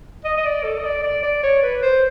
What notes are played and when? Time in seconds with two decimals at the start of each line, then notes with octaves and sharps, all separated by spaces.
0.25 D#5
0.37 D#5
0.45 D5
0.64 A4
0.78 D#5
0.84 D5
1.03 D5
1.23 D5
1.43 C#5
1.63 B4
1.82 C5